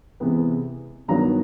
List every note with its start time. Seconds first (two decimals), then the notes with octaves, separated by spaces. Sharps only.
0.20 C3 E3 G#3 B3
1.08 G2 D#3 F#3 B3 A#5